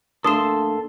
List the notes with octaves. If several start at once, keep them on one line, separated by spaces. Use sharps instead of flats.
A3 A#3 D4 A4 C6 D#6 E7